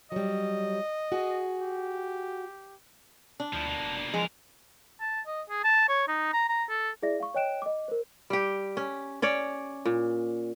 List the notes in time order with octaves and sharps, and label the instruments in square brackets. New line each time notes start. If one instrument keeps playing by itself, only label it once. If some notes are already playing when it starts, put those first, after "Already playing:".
[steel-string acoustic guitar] F#3 G3 [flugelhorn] D#5
[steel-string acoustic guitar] F#4 G#4
[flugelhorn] G4
[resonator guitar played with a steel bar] D4
[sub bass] D2 [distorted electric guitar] F3 E4
[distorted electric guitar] B2 A#3
[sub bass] F1
[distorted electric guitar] E2 A#4 [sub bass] F3 [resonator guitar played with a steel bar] G#3
[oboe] A5
D#5
G#4
A5
C#5
D#4
A#5
A#5
A4
[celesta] E4 G#4 D5 E5 A#6
F5 C#6
C#5 D#5 G5 F#6 D7 E7
D#5 D6
A#4 C5
[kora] G3 G4
C#4
C#4 C#5 D5
A#2